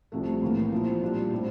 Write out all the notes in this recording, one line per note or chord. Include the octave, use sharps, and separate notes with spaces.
C2 C3 F3 A3
A2 E3 A#3
A#2 F3 C4 E4
A#2 G3 D4 F4
A2 G3 C4